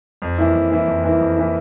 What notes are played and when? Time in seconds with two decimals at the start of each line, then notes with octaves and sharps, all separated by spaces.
0.22 F2
0.38 E3 A#3 E4
0.55 F2
0.71 E3 A#3 E4
0.87 F2
1.04 E3 A#3 E4
1.20 F2
1.36 E3 A#3 E4